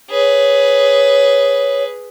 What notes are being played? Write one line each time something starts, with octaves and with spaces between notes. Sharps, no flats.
G#4 B4 C#5